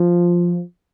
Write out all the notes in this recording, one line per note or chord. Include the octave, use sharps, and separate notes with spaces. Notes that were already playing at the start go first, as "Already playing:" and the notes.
Already playing: F3